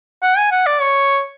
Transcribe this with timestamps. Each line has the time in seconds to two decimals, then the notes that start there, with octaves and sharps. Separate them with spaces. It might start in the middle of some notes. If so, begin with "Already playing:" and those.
0.22 F#5
0.37 G#5
0.51 F#5
0.66 D5
0.81 C#5